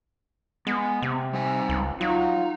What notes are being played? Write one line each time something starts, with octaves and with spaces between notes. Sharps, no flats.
G#3 B3
C3
G3 C4 D#4 G#5
C#2
F#3 D#4 F4